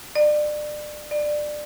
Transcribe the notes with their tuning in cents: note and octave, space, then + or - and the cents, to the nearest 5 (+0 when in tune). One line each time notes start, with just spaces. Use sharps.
D5 +30
D5 +20